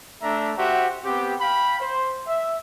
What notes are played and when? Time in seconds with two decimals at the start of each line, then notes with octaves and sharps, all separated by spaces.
0.22 A3 D4 E5 A#5
0.56 F#4 G4 C5 E5
1.04 B3 C4 G4
1.40 F5 G5 B5
1.81 C5
2.27 E5